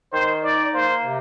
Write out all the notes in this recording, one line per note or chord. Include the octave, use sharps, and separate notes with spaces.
D#3 C5
D#4 D5
A#3 C5
C3